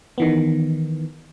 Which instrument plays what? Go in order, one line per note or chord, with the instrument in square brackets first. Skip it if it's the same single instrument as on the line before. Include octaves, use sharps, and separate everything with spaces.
[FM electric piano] D#3 E3 B3